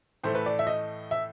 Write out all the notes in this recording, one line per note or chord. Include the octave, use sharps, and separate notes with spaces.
A2 E3 A3 C5
B4
D5
E5
D#5
E5